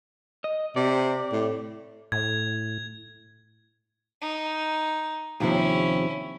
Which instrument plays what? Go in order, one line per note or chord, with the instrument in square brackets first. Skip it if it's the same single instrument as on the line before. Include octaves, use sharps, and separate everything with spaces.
[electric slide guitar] D#5
[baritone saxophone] C3 [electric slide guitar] D5
[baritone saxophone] A2
[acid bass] A2 [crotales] G#6
[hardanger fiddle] D#4
[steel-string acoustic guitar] D#2 C3 F3 [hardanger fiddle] C#4 E4